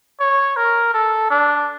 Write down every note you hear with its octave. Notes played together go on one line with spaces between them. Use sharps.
C#5
A#4
A4
D4